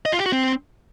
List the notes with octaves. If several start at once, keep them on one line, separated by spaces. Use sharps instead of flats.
D#5
F4
G4
F#4
C4